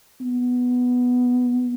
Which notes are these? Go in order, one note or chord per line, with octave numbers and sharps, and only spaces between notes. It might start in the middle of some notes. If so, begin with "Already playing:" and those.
B3